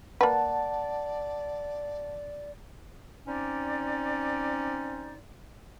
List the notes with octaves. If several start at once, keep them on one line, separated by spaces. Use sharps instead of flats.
A#3 B4 D5 F#5 A5
C4 C#4 D#4 D5